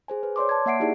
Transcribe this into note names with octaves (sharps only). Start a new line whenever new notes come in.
G#4 C5 G#5
B4
C#5 D5 C6 D6
A5 G#6
A#3 E5 F#5 C7 D7
D#4 E4 G4 G#4 D5